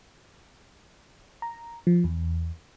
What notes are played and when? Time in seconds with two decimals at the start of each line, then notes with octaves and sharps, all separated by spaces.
1.42 A#5
1.87 F3
2.04 E2